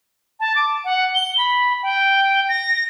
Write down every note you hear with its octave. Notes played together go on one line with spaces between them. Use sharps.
A5
D6
F#5
G7
B5
G5
A#6